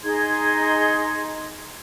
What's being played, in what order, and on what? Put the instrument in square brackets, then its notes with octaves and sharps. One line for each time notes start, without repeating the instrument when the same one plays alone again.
[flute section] D#4 G#4 C6 G#6